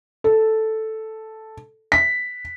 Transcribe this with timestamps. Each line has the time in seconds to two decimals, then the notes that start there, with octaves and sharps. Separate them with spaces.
0.24 A4
1.92 B6